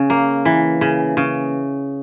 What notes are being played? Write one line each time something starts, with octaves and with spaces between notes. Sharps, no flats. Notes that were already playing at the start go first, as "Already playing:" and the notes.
Already playing: C#3
A#3
E3
C#3
C#3